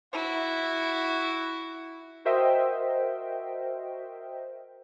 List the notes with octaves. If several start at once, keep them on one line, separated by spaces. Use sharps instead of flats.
E4 F#4
F#4 A#4 C5 D#5 E5 G5